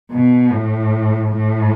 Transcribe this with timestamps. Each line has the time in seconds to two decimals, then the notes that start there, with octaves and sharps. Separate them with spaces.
0.11 B2
0.51 A2
1.32 A2